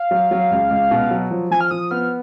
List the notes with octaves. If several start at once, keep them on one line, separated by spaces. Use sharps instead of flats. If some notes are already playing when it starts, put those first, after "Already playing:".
Already playing: F5
F#3
F#3
C#2
C#2
B2
F#3
F3
F3 G#5
F6
F3 D#6
B3 F6